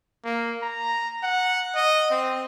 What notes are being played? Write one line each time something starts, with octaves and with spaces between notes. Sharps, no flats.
A#3
A#5
F#5
D#5
C4